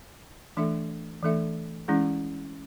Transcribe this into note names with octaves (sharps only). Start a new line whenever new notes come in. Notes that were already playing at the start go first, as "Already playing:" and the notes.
E3 A3 D4 A4 E5
E3 A3 D4 A4 E5
E3 G#3 C#4 E4 G#4